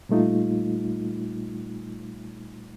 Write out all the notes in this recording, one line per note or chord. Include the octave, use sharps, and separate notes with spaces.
A#2 G3 A3 D#4 F4